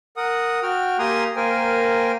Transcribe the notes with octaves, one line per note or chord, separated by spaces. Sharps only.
A#4 F#5 D#6
F#4 G5 F6
A#3 G4 G#5 A#5 C6 D#6
A#3 A#4 C5 G5 G#5